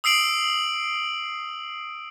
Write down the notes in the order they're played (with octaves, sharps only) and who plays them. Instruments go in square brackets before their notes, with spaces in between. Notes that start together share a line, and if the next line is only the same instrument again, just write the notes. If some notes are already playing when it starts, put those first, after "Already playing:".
[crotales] D#6 E6 C7 D7 F#7